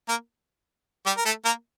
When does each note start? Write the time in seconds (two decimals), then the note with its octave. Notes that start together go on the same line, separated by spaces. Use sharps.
0.09 A#3 A#4
1.06 G3 G4
1.17 A#4
1.25 A3 A4
1.45 A#3 A#4